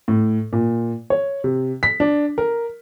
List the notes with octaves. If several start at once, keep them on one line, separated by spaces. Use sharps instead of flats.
A2
A#2
C#5
C3
B6
D4
A#4